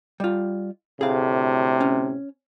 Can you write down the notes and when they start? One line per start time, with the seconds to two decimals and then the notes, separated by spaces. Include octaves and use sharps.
0.20 G3 F4
1.01 D2 A2 C3 G#4 F5
1.81 C#4